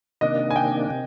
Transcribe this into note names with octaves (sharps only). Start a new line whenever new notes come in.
C3 D#3 A#3 D4 D#5
G#5
G5
C3